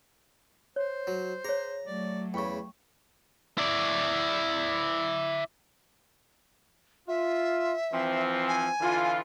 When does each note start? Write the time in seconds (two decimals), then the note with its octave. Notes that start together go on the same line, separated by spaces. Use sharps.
0.76 C5 C#5
1.07 F#3
1.45 G#4 C#5 A#5
1.85 F#3 A3 D5
2.34 E2 C#3 G5 B5 C#6
3.58 E4 D5
7.08 F4 E5
7.93 E3 F3 C4
8.48 G#5
8.81 D3 E3 F4